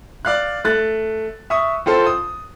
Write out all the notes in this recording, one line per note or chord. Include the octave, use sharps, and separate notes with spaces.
D5 F5 F#6
A3 F#6 A6
E5 C#6 D#6
C4 F4 A4 C5
D#6